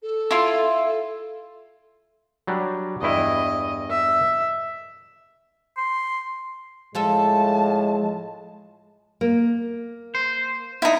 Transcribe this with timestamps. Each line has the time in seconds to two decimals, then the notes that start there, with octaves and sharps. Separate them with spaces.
0.02 A4
0.31 E4 F4
2.47 F#3 G3 D4
3.02 E2 G2 E4 D#5
3.90 E5
5.77 C6
6.95 A2 F3 G#3 F4 A4 A5
9.21 A#3
10.15 C5
10.82 D#4 E4